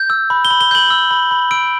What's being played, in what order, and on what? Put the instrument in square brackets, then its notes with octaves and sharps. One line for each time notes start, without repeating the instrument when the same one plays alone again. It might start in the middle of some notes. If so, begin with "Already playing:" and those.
Already playing: [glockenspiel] G6
E6
B5
G7
B5
G7
G6 F#7
E6
B5
B5
E6 D7